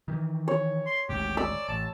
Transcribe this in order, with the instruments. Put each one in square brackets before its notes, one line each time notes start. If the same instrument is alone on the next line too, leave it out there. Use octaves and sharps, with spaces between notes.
[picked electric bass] D#3 E3
[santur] C#5
[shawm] C6
[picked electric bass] G#1 D2 G#2 [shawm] G4
[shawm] D5 [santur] E6
[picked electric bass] A1 [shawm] A5